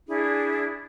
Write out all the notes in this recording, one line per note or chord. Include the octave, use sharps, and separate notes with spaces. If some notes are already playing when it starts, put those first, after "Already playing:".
D4 E4 G#4